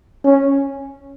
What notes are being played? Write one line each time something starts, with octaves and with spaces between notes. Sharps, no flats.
C#4